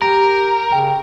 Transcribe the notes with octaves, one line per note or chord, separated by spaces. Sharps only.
G4 A#4 A#5
C#3 G5